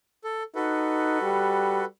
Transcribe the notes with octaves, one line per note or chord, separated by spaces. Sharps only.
A4
D#4 F#4 A4 B4
G3